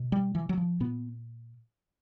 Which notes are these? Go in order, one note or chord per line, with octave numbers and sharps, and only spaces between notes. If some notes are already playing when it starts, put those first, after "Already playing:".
Already playing: B2
G3
E3
F#3
F3
A#2 B3